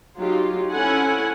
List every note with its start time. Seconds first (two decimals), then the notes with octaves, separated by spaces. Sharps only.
0.17 F#3 D#4 F4 G4
0.71 C4 C#4 E4 A4 F#5 G#5